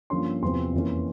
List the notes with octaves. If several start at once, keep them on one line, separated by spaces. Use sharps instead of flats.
G2 F3 A#3 C#4 C6
E2 C3 F3 C4 C6
F2 E3 A#3 C#4